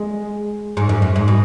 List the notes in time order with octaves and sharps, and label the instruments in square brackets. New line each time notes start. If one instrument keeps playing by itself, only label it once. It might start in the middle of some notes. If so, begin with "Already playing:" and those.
Already playing: [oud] G#3
G#2
F#2
F#2
G#2
B2